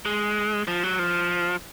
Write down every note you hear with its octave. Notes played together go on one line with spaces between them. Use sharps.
G#3
F3
F#3
F3